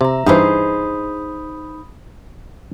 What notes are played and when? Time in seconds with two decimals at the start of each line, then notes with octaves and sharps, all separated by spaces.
0.01 C3 E5 A#5
0.26 G2 E3 D#4 G#4 C5 B5 D#6 G6